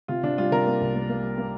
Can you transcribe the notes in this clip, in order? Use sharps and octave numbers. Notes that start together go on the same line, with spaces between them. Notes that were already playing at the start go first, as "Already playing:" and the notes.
C3 F4
C3 D4
G3 F4
C3 A#4
A#3
C2
A#3
A#3
G3
A#3